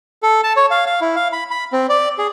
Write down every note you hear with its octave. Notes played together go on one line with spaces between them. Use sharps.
A4
A5
C#5
F5
F5
E4
F5
B5
B5
C4
D5
G#4